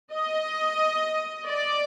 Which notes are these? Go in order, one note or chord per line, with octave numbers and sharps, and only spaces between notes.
D#5
D5